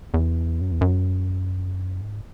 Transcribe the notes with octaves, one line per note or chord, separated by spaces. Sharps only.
E2
F#2
E2
F#2
G#2